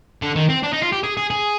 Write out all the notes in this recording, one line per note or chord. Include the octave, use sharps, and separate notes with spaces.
D3
D#3
C4
D4
D#4
F4
G4
G#4
G#4
G#4